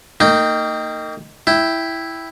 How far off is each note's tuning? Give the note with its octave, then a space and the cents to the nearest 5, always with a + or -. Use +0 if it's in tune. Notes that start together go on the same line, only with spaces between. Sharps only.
A#3 -35 D#4 +0 G5 +0
E4 +0 G5 +0